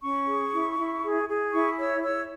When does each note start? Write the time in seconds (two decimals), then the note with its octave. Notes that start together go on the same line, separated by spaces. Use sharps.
0.02 C#4 C#6
0.27 G#4
0.52 E4
0.78 E4
1.03 G#4
1.29 G#4
1.52 E4 C#6
1.78 C#5 E6
2.03 C#5 E6